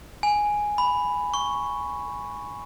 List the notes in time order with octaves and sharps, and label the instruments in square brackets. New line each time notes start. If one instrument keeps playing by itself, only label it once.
[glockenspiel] G#5
B5
C#6